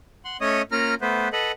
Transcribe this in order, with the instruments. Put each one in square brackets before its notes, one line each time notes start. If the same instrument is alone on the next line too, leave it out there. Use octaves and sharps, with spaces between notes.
[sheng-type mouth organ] F#5 C6
A3 C#4 C#5 D#5 D#6
A#3 C#4 F4 A#5 F6
A3 B3 B4 C5
A4 B4 D#5 F#5